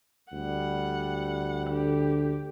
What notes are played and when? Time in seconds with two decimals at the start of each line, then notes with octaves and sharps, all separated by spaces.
0.33 D2 G3 F#5
1.70 D3 G4